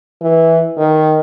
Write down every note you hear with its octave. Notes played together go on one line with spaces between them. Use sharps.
E3
D#3